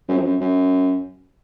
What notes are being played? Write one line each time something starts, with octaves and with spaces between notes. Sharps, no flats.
F#2
F2
F#2
F#2